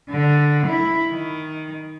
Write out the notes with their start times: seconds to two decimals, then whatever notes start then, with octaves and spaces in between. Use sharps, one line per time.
0.11 D3
0.68 E4
1.10 D#3